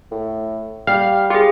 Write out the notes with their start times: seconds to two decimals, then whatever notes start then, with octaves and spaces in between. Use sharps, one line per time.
0.11 A2
0.87 G3 G4 F5
1.30 F4 G4 G#4